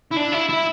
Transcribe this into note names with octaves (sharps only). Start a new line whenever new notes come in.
E4
D4
E4
E4